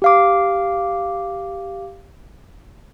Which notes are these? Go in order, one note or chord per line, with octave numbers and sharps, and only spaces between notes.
G4 F5 D6